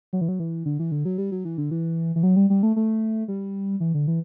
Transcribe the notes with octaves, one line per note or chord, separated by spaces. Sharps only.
F#3
E3
F#3
E3
D3
E3
D3
F#3
G3
F#3
E3
D3
E3
E3
F#3
G3
G3
A3
A3
G3
E3
D3
E3